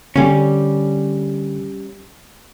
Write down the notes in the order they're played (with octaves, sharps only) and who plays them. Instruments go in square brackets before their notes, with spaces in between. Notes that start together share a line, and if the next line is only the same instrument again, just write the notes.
[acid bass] D3 [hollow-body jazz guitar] G3 C#4